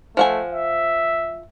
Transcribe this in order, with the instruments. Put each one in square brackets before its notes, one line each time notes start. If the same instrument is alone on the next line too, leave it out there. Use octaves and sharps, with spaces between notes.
[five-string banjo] F3 F#5 G#5 [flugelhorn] A3
[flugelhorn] E5